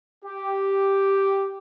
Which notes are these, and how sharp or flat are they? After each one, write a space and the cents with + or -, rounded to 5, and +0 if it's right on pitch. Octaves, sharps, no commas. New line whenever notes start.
G4 -5